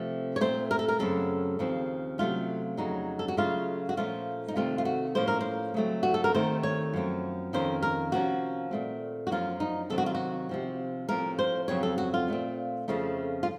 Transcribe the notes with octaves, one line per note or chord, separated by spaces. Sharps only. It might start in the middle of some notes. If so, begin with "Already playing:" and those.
Already playing: C3 F3 A3 C4
C#5
A#2 A3 C4 C5
A#4
A4
A#4
F#2 C#3 F#3 C4 A4
D#2 C#3 F3 C4
C3 F#3 A3 C#4 F4
F2 C#3 F#3 D#4
A4
F#4
C#3 F#3 A3 F4
F#4
A#2 F3 A3 C#4 F4
D#4
C3 D#3 A3 C4 F4
F4
F#4
A2 F3 A#3 C#4 C5
A#4
C5
C#3 F#3 A3 C4
F#4
A4
A#4
D#2 D#3 A3 C4 C5
C#5
F#2 F3 C4
F2 D#3 A#3 C#4 C5
A#4
C3 F3 A#3 C#4 F#4
A#2 A3 C4
F#4
F#2 F3 A#3 C#4 F4
D#4
C3 D#3 F#3 C4 A4
F#4
F4
F#4
C3 F3 C4
A2 F3 C4 A#4
C5
F2 C#3 F#3 C4 C#5
A4
F#4
F4
A#2 A3 C4
F2 C#3 F3 A3 C4
F4